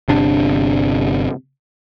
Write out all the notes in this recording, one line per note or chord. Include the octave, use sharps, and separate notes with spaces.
G1 C3 D4